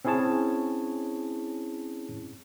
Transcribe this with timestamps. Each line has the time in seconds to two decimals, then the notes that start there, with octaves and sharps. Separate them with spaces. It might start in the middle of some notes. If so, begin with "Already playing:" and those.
0.05 C4 C#4 E4 G#4 C#5 A5